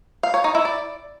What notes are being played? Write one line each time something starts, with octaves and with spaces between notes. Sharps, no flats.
F5
C#5
D#4
E4
D5